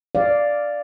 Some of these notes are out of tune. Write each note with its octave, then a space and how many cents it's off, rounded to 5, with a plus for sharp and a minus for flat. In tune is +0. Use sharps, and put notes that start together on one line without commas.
D5 +0 F5 +0